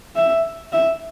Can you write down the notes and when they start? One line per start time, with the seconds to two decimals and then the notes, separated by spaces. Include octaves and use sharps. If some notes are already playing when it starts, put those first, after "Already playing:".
0.15 E5
0.73 E5